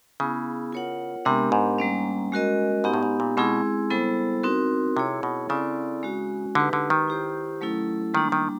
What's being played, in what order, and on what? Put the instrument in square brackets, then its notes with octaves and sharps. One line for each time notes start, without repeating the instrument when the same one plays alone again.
[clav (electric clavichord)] C#3 [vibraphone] B3 E4 G#4
[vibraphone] F4 A#4 C#5 F#5
[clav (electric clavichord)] C3 [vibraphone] G#3 B3 D4 G4 A#4
[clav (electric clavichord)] G#2
[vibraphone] G3 A#3 C#4
G#3 C#4 F#4 A#4 D#5
[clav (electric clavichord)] G#2 [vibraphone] B3 D#4 G4
[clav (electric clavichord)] A2
G#2
A#2
[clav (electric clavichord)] B2 [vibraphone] G#3 C4 E4 G#4
[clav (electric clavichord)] C#3 [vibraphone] G3 B3 E4 A4 C5
[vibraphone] C4 D#4 F#4 A#4
[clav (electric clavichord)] C3 [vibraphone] E4 G#4 C#5
[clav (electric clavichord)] B2
[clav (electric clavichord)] C#3 [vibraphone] C4 E4 A4 D5
[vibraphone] G#3 C#4 F#4
[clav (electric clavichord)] D3 [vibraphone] D#4 G4 B4
[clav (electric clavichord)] D3
D#3
[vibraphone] E4 G4 C5
F#3 A3 C#4 E4 A4
[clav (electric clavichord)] D#3 [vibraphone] G3 A#3 D4
[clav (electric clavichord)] D#3